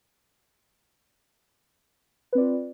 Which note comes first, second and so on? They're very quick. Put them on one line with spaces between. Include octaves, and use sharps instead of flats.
B4 C4 D5 F4